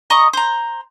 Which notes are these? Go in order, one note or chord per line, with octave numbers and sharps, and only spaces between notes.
D#5 A#5 C#6 D#6
C5 A#5